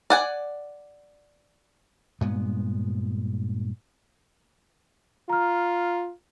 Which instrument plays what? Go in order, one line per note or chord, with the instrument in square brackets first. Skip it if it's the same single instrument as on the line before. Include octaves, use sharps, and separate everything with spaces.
[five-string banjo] D5 F#5 G#5
[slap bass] G2 A#2 G#3 B3
[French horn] F4 [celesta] A#5 F6